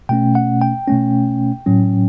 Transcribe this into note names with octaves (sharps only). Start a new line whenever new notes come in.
B2 A3 C#4 G5
F#5
G5
B2 A3 C#4
A2 F#3 C#4